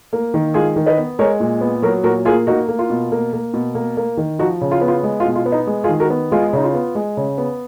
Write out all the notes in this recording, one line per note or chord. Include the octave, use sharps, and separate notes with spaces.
A#3
D#3
G#3 F4 G#4
D#3
B4 D#5
B3
G#3 A#4 C#5
A#2
B3
F#3 F#4 A#4
A#2 F#4 A#4
A#3 F4 G#4
A#3 D#4 F#4
A#3
F4
B2
A#3
A#3
B2
A#3
A#3
D#3
F3 D#4 F#4
C#3
F4
B3
F4
G#3
F4
B2
F4
B3
D#4
G#3
F4 G#4
D#3
F#4 A#4
B3
G#3 F4 G#4
C#3 D#4
F4
B3
G#3
C#3
B3